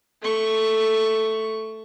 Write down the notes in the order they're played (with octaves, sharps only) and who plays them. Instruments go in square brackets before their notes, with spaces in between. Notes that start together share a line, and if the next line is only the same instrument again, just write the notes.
[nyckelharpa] A3 C#6